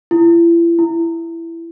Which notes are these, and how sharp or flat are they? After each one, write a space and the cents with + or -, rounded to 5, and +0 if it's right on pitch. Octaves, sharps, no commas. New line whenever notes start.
E4 +40
E4 +15